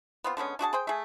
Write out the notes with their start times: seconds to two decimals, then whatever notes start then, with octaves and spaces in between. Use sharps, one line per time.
0.24 B3 C4 F4
0.37 D3 G#3 B3 C#4
0.59 D4 F#4 G#4 A5
0.73 G#4 C5 G5
0.87 A3 G#4